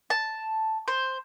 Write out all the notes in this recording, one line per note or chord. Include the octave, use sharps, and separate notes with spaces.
A5
C5